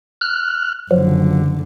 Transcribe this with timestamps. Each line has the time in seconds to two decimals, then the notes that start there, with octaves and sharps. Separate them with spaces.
0.21 F6 F#6
0.91 F#1 D3 F3 F#3